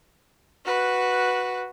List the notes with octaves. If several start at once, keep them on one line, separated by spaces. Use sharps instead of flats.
F#4 B4